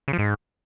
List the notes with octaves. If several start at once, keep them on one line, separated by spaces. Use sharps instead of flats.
C#3
F3
G#2